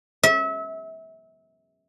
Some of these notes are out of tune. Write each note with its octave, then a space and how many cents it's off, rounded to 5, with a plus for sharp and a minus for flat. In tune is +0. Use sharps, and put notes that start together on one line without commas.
E5 -30